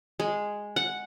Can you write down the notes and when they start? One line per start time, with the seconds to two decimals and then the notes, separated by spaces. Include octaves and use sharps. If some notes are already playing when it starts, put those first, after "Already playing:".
0.20 G#3
0.76 F#5